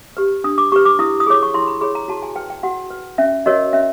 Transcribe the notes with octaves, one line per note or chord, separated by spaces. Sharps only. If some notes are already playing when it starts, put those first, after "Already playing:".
G4 B4
D4 D#6
D6
G4 B4 C#6
D6
E4 D#6
D#6
G#4 C#5 D6
C#6
E4 C6
B5
G#4 C#5 B5
A#5
F#4 A5
G#5
B4 G5
G5
F#4 F#5
B4
C#4 E5
F#4 A#4 C#5 D#5
C#4 E5